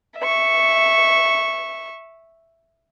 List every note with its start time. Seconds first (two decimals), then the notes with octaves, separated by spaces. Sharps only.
0.18 E5 C#6